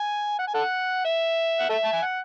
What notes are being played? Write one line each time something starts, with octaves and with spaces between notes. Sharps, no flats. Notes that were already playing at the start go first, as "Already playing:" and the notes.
Already playing: G#5
F#5
G#5
A4 F#5
E5
F#5
A4 E5
A5
G#5
F#5